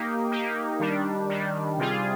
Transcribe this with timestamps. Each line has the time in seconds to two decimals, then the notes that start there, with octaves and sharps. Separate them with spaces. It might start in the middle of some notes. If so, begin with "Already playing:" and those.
Already playing: A#3 D#4 G4
0.32 A#3 D#4 G4
0.80 D#3 G3 D4
1.29 D#3 G3 D4
1.78 C3 G3 C4 F4 G#4